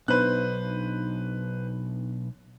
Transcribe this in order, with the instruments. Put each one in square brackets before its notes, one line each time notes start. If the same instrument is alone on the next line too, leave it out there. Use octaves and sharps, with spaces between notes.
[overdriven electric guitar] B1 [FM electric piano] B3 D4 D#4 [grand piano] B4 C5 F#6